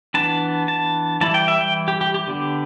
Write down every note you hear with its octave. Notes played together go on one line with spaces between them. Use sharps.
E3 B3 D4 A5
A5
E3 G3 E4 A5
G5
E5
G5
G4
G4
G4
D3 B3 D4